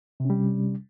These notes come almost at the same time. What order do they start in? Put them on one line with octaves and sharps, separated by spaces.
C3 C#4 G3